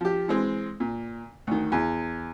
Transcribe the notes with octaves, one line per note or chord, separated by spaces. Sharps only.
F3 G4
E3 G#3 C4
A#2
D2 D#3
E2